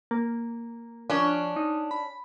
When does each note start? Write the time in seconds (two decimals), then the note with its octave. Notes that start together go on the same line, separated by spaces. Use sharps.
0.11 A#3
1.10 F3 C#4 D4
1.56 D#4
1.91 B5